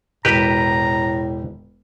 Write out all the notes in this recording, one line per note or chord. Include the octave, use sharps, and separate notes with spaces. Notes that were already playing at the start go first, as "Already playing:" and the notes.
E1 A2 G4 B4 A#5